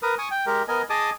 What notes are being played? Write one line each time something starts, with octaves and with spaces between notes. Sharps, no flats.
A#4 B4 D#6
G#5 C#6 D#6
G5
G#3 G4 A#4
B3 A#4 D#5 G#5
G#4 D#5 G#5 A5 D6 D#6